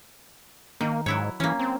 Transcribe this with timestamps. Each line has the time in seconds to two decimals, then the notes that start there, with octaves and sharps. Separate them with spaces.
0.81 D#3 A#3
1.06 G#2 F#3 E4 C#5
1.40 E3 A#3 C#4
1.59 C4